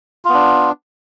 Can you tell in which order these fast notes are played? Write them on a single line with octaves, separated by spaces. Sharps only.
F4 B3 D4